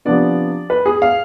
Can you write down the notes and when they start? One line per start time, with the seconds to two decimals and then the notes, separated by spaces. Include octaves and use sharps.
0.05 C3 F3 B3 D4 D5
0.70 B4
0.86 G#4
1.02 F5